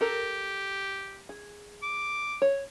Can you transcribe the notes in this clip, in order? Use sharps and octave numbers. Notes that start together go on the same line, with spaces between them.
G4 A4 A#4
G#4
D6
C#5